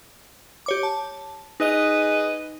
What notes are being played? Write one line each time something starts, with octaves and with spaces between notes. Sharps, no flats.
G4 C#5 D6
A5
D#4 G#4 B4 D#5 D#7